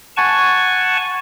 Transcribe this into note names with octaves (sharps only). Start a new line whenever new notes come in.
F#5 G#5 A5 C#6